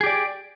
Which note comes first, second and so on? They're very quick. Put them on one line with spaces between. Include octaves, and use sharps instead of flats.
G#4 G4 D5